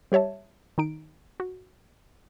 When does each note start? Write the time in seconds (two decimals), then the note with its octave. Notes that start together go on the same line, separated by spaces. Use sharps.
0.12 G3 G4 C#5 E5 A5
0.78 D#3 D#4 D7
1.40 F#4